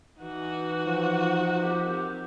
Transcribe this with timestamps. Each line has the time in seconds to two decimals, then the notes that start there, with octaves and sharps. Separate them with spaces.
0.21 E3 D#4 F#4
0.87 F3
1.63 A#3 C4 G4